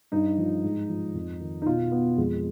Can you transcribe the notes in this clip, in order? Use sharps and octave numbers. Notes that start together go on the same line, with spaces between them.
G2 D#4
F3
G#2
F3
F2
D#3
D#4
B2 F4
B3
F2 G#3